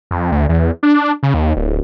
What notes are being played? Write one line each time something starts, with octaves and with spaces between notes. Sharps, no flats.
F2
D2
E2
D4
C#3
D#2
D1